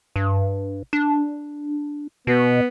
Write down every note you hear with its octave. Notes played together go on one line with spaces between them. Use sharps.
G2
D4
B2 B3